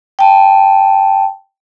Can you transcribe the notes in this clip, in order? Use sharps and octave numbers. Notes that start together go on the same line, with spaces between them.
G5 A5